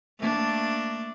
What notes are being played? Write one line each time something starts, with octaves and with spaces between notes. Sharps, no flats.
A3 A#3 D4